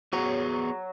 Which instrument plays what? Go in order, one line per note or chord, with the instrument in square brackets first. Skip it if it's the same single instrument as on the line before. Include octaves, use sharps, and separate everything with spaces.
[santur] F#3 [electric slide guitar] B3 G#4 C#5